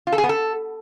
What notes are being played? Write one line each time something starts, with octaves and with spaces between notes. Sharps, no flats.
F4
A4
G#4
B3
A4